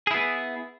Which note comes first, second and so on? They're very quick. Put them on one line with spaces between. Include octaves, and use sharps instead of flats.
G#4 E4 B3